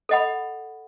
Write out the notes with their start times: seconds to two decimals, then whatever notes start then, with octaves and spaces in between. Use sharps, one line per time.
0.09 A4 D#5 F#5 B5